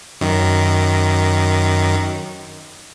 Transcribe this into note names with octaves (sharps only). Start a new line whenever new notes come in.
F#2 D#3